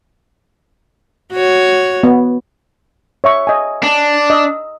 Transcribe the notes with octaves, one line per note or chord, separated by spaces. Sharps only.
F#4 C#5
B3
C#5 E5 C#6
D#5 G#5
D4
D#5 E6